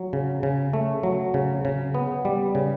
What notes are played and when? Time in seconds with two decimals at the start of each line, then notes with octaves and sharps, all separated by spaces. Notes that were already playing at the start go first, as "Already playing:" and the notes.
Already playing: F#3
0.13 C#3
0.43 C#3
0.73 A3
1.03 F#3
1.34 C#3
1.65 C#3
1.95 B3
2.25 G3
2.55 C#3